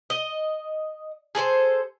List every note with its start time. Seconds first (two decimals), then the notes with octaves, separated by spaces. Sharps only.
0.10 D#5
1.35 G#4 A4 B4 C5